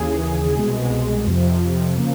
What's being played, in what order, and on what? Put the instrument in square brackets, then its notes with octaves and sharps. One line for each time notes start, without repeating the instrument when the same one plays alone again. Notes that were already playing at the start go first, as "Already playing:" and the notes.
Already playing: [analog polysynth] D#2 C#3 E3 G#4
C2 B2 G#3
F2 C3 F3
C#3 F3 A#3